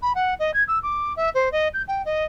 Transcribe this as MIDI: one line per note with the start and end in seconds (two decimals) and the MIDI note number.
0.02 0.12 83
0.15 0.34 78
0.39 0.51 75
0.54 0.63 92
0.68 0.79 88
0.83 1.13 86
1.16 1.29 76
1.34 1.51 72
1.52 1.68 75
1.74 1.82 91
1.88 2.02 79
2.05 2.24 75